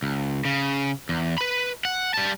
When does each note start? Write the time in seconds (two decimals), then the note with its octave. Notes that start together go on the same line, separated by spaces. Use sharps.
0.03 C#2
0.45 C#3
1.09 E2
1.38 B4 B5
1.85 F#5
2.14 G3 A5